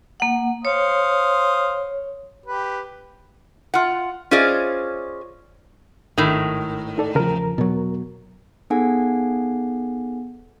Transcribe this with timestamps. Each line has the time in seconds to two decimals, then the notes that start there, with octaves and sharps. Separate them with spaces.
0.20 A#3 F#5
0.65 C5 C#5 F5 D#6
2.46 G4 B4
3.74 F4 F#5
4.31 C#4 F4 G#4 C5 D5 D#5
6.18 G#1 A2 D#3
6.98 D#4 A4 D5
7.15 E2 C#3 F3 A#4 A#5
7.58 B2 F#3
8.70 B3 D#4 G#4 A4 F#5 G#5